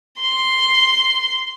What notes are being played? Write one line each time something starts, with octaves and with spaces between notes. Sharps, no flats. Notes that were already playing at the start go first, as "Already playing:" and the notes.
C6